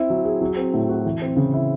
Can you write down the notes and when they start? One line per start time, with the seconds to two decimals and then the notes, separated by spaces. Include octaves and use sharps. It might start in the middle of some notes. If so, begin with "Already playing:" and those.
Already playing: C4 E4
0.10 F#3
0.25 G#4
0.41 F#3
0.57 C4
0.74 A2
0.89 F#4
1.05 E3
1.22 C4
1.36 C#3
1.54 E4